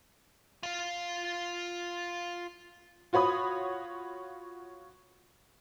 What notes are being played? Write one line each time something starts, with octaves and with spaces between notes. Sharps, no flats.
F4 F5
F4 F#4 C#5 B5 D#6